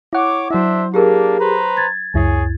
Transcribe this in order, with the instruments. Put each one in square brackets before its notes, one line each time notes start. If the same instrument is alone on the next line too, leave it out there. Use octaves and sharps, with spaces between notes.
[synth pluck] E4 F#5 [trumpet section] C#5 D6
[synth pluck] F#3 E4 [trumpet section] D4 C5 E5
[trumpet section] A#3 D4 [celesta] G4 G#4 A#4
[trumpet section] B4 C5 A#5
[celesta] G#6 A6
[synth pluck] C#2 F#2 E4 [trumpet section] G#4 C#5 G#5